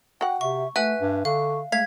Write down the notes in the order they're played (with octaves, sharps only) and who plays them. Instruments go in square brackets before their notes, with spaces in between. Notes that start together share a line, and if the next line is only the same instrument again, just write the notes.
[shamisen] F#4 F#5 [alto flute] G5
[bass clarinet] C3 [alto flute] E5 [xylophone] C#6
[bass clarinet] A3 [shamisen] F#4 [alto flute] B4 [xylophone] E5 G#5 F#6
[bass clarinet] G2
[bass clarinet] D3 [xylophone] F5 [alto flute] C#6
[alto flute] G#3 [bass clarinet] A3 [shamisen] F5 [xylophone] G#6 B6